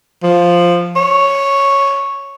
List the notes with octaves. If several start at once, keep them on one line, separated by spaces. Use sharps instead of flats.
F3
C#5